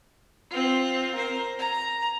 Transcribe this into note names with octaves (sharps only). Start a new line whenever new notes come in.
C4 F4
A#4 C5
A#5